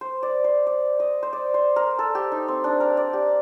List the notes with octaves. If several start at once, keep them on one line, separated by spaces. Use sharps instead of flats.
C5
D5
C5
D5
D#5
C5
D5
C5
A#4
A4
G4
D#4
C4
D4
A#4
D5
G4